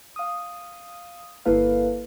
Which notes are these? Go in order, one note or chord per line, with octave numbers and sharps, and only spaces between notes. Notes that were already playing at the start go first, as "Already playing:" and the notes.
F5 D#6
G1 A#3 E4 A4 B4 F5